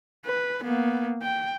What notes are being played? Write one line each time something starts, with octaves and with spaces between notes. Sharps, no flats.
B4
A#3 B3
G5